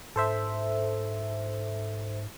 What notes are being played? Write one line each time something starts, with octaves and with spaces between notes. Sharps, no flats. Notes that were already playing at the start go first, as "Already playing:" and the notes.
G#2 A4 C5 E5